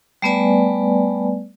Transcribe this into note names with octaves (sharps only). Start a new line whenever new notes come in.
G3 A3 B3 B4 D5 G#5